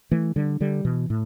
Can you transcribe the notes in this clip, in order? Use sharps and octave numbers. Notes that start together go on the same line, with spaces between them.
E3 A3
D3 G3
D3 G3
B2 E3
A2